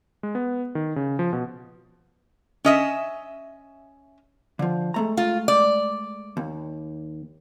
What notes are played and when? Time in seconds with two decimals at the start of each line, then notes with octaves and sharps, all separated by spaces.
0.23 G#3
0.35 B3
0.75 D#3
0.96 C#3
1.19 F3
1.33 B2
2.65 C#4 D#5 E5
4.59 D3 F3
4.94 G#3 A3 A#5
5.17 F4
5.48 D5
6.37 D#2